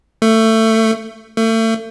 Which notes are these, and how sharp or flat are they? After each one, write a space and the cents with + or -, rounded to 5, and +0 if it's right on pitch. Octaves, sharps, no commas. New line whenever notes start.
A3 +20
A3 +35